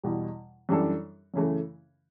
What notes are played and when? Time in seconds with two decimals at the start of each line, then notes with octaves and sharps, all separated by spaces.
0.03 E2 B2 G3
0.69 F#2 E3 G3 D4 A4
1.34 F#2 C#3 E3 A3